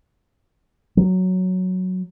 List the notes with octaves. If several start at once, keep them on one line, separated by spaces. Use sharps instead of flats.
F#3